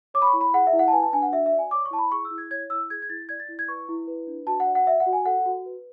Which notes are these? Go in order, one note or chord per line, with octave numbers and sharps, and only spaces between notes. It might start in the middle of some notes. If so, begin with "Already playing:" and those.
C#5 D6
B5
C#6
E4
B5
G#4 F#5
E5
E4
F#5
A5
B4 G#5
A5
D4 G#5
F#5
F#4 E5
E5
D5
G#5
C#5 D6
C#6
E4 A5
B5
G#4 C#6
E6
E4
G#6
C#5 G#6
E4 E6
G#4 G#6
G#6
E4 A6
D5 G#6
A6
E4
G#6
B4 C#6
E4
B4
D4
F#4 A5
F#5
D5
F#5
D5 E5
F#5
F#4
G#5
A4 F#5
F#4
B4